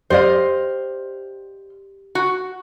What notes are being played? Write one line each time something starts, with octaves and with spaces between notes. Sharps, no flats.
G4 C5 D5 D#5 F5
F#4